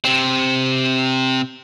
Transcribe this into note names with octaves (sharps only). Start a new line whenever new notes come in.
C3 C4